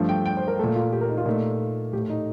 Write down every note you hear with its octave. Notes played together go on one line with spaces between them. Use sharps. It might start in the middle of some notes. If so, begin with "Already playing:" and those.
Already playing: G2 F3 A3
G5
G5
C5
A#4
A#2 A3 A4
F4
G4
A#4
D#4
F4
A#2 A3 D#4
A2 A3 G4
D#4